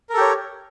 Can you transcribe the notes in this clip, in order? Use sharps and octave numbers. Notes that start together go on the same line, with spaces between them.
G4 A4 A#4 C#5